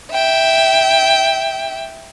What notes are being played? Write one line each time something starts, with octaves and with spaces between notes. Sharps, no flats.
E5 G5